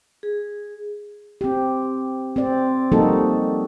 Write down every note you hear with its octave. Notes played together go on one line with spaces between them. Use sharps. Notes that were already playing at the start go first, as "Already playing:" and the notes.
G#4
C4 G4
C4 D5
F3 G3 A#3 D#4 F#4 A4